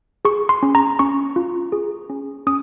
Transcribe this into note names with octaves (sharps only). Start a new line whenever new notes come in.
G#4 C#6
C6
C#4
A#5
C#4 C#6
F4
G#4
C#4
C#4 D#6